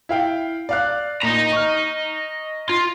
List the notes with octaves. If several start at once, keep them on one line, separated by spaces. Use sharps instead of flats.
E4 F5 G5
D5 F5 F#6
A#2 D#5 A#5
C#6 F6
F4